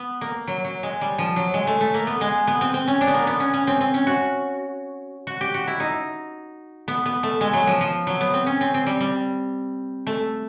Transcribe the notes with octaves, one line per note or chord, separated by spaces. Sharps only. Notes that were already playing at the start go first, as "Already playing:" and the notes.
Already playing: B3
A#3
F#3
F#3
G#3
G3
F3
F#3
G#3
A3
A3
A#3
B3
G#3
B3
C4
C4
C#4
D4
B3
A#3
B3
C#4
C#4
C4
C4
C#4
F#4
F#4
G4
F#4
E4
D#4
B3
B3
A3
G#3
F#3
F3
F3
F#3
B3
C4
C#4
C4
C4
G3
G3
A3